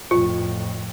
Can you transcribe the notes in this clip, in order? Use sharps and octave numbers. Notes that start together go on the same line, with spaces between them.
F2 A2 F4